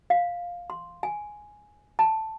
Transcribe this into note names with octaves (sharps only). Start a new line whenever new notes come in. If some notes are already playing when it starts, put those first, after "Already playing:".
F5
C6
G#5
A5